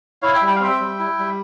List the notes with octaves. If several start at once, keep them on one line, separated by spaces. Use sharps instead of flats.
E4 C#5 F5
E5 G5
G3
G5
F5
C4 E5 G5
G3
E4
G3